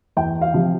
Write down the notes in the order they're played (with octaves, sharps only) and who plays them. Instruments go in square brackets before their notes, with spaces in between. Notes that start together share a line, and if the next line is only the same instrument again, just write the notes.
[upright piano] E2 G5
F5
C3 F3